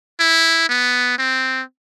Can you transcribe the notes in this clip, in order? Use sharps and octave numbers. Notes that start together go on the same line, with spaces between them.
E4
B3
C4